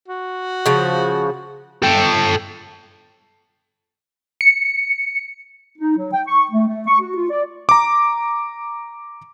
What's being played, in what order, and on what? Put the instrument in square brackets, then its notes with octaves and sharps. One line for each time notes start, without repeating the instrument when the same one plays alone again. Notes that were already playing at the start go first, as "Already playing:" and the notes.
[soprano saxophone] F#4
[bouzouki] C#3 F3
[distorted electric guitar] A4 G5
[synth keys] C#7
[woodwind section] D#4
F#3
G5
C#6
A3
A3
C#6
F#4
F4
D5
[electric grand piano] A#5 D6